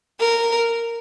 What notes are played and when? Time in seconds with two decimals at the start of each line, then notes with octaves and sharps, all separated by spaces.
0.20 A#4